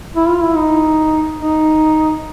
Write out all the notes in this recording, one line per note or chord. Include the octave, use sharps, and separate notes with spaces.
E4
F4
E4
D#4
D#4